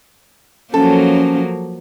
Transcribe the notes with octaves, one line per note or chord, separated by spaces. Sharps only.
F3 F#3 A#3 C#4 A4